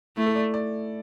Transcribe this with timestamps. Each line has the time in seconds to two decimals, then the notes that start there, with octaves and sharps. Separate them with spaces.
0.17 A3 E4
0.26 A4
0.35 D5
0.54 D5